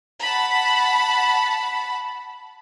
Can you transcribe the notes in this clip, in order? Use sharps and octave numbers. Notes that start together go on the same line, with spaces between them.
F#5 A5 B5